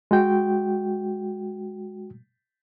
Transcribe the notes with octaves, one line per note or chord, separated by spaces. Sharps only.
G#3 F#4 G5